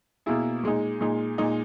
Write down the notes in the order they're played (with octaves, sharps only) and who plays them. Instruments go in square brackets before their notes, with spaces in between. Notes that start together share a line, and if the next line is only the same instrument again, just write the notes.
[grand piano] B2 A#3 E4 G#4
A#2 G#3 D#4
A#2 G#3 D#4
A#2 G#3 D#4